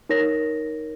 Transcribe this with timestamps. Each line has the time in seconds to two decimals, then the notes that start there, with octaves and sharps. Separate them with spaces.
0.09 D#4 A#4 C#5 A#6